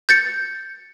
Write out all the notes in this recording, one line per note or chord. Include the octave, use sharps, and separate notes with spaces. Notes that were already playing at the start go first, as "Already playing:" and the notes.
G6 A6 C#7